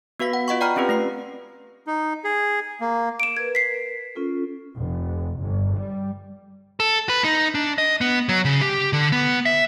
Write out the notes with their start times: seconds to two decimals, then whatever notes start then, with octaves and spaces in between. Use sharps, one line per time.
0.20 B3 F#4 B4 F5 B6
0.33 F#5
0.48 F4 D#5 F#5 C#6
0.61 D5 G5 A#5 B5 F6
0.76 C4 C#4 F4 G4 B4
0.89 A3 B4 C7
1.87 D#4
2.24 G#4
2.81 A#3
3.20 D7 E7
3.37 A#4 B4 G#6
3.55 B6 C7
4.15 C#4 F4 A4
4.77 F1
5.40 G1
5.78 G3
6.80 A4
7.09 B4
7.24 D#4
7.55 D4
7.78 D#5
8.01 B3
8.29 F#3
8.45 C#3
8.61 G4
8.93 D3
9.12 B3
9.46 E5